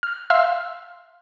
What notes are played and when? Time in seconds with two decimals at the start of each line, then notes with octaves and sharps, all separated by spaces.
0.03 F6
0.30 E5 F5 C6 E6 F6